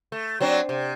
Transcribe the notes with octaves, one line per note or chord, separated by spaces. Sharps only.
A3
F#3 C4 D4
C3